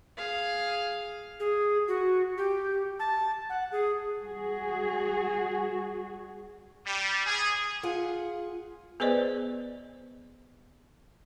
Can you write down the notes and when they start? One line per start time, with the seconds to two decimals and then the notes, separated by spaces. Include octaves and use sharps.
0.17 G#4 F5
1.40 G#4
1.88 F#4
2.38 G4
2.99 A5
3.49 F#5
3.72 G#4
4.22 G3 F#4 G#4
6.86 G3
7.25 G#4
7.83 F4 G#4 F#5
9.00 B3 G#4 B4 C5 D5 D#5